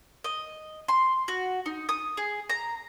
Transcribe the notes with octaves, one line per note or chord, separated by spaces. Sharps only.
D#5
C6
F#4
D#4
D#6
G#4
A#5